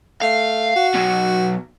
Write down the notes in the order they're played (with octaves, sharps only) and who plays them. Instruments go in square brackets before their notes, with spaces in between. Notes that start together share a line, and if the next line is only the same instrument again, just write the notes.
[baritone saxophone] A3 [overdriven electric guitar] F5
[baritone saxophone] F#4
[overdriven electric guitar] B2 F#3